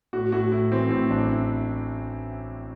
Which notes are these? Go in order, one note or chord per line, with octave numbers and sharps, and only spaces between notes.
A2 F#4
A2 F#4
A2 E4
E3 C4
A2 C4
A1 D4
E4